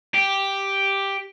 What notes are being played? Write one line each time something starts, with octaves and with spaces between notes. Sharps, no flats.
G4